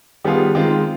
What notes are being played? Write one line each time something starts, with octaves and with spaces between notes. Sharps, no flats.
D#3 G3 B3 F4 G#4
D#3 G#3 C4 F4